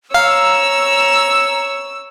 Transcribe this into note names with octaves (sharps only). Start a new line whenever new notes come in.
C#5 F5 A#5 E6